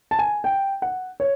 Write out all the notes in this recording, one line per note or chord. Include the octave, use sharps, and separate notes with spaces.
A5
G#5
G5
F#5
C#5